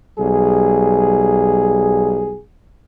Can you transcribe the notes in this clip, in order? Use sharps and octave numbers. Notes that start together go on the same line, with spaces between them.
B1 G3 G#4